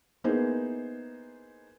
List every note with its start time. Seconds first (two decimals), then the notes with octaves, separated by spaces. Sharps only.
0.24 A#3 B3 D#4 E4 G#4 C5